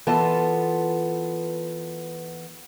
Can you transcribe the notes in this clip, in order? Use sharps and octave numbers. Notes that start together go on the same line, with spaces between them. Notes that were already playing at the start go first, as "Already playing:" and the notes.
E3 B3 F4 A4 A5